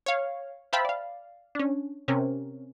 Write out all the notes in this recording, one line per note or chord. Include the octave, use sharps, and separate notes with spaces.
C#5 F5
C5 E5 F5 G5 A5 B5
D5 F5
C#4 D4
C3 C#4 A#4